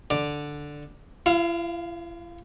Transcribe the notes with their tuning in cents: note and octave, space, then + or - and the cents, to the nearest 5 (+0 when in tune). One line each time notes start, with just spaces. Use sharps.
D3 +0 D5 +0
E4 +45 F5 +0